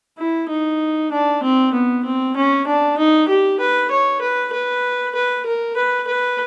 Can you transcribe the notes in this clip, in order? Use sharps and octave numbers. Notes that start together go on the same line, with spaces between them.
E4
D#4
D4
C4
B3
C4
C#4
D4
D#4
G4
B4
C#5
B4
B4
B4
A#4
B4
B4